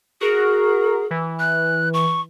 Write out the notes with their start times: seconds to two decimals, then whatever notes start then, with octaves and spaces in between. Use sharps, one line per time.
0.21 F#4 G#4 A#4
1.11 E3
1.39 F#6
1.94 C#6